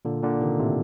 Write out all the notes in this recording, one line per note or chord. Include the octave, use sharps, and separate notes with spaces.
A#2 D3
A#2 D3
C3 D#3
A2 C3